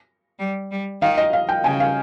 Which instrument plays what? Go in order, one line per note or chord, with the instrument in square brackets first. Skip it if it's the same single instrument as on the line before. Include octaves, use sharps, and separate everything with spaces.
[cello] G3
G3
[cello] D#3 [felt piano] F5
[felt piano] D#5
F5
G5
[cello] C#3 [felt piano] G#5
[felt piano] F5